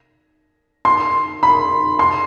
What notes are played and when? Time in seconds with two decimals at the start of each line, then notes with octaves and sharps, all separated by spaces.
0.85 C6
1.43 B5
1.99 C6